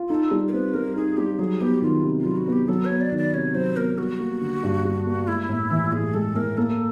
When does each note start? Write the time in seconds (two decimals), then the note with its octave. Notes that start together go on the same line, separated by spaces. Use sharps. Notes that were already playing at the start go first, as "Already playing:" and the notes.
Already playing: F4
0.09 D#4 A4
0.31 G3
0.48 A#4
0.53 C4 B4
0.74 G3 A#4
0.96 D#4 G#4
1.17 G3 G4
1.39 F#3 G#4
1.61 B3 G4
1.82 D#3 F4
2.04 C3
2.20 F4
2.25 F#3
2.36 F#4
2.48 B3 G4
2.68 F#3 A4
2.85 C#5
2.90 B3
3.01 D5
3.12 D#3
3.17 D5
3.34 C3 C#5
3.55 F#3 C5
3.76 B3 A#4
3.98 G3 F#4
4.20 A#3
4.41 D3
4.63 G2
4.85 G3
5.06 A#3
5.28 G#3 E4
5.49 A2
5.71 E3
5.92 A2 G#4
6.14 G#3 A4
6.35 A2 A#4
6.57 A#3 A4